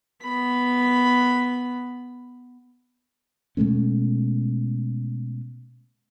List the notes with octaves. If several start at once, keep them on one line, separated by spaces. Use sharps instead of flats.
B3 B5
B2 G#3 A3 C#4